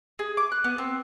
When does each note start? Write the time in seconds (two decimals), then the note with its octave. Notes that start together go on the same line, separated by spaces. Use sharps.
0.19 G#4
0.37 D6
0.52 F#6
0.64 B3
0.78 C4